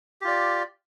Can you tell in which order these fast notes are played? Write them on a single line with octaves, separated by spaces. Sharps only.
G4 F4 D5